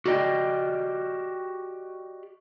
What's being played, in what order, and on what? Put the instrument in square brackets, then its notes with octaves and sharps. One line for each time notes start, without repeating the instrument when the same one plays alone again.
[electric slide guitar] F#4 G4 D5 D#5 G5